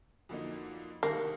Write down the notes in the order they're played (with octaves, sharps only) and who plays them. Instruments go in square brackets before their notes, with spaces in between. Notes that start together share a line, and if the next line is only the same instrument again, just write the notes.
[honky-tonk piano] F2 D3 F#3 A#3 D#4
[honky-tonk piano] C2 C3 D#3 [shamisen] A#3